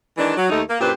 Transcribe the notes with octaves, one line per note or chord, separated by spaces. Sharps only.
D#3 E3 G#3 D4
F#3
D#2 A3 D#4
A#3
F#2 A#2 D4 G4 B4 C5